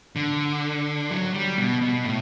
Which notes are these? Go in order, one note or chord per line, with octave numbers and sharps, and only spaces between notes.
D3
F#3
G3
B2
B2
A2